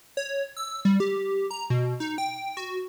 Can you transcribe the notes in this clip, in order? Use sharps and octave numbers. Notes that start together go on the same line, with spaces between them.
C#5
E6
G3
G4
A#5
B2
D#4
G5
F#4